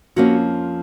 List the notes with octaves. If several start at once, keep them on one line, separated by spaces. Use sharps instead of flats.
F2 F3 A#3 C#4 F#4